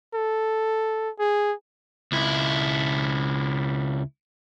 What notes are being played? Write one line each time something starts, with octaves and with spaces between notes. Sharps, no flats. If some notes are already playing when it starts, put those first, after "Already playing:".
A4
G#4
C#2 E4